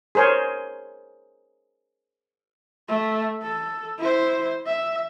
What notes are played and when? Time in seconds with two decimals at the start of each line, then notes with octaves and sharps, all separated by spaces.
0.15 G#4 A#4 C5 C#5
2.88 A3
3.42 A4
3.98 E4 C5
4.66 E5